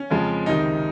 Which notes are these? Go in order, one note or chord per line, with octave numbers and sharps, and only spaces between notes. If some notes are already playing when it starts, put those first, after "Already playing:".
Already playing: C#4
F2 C#3 F3 G#3
C#2 C3 D#3 D#4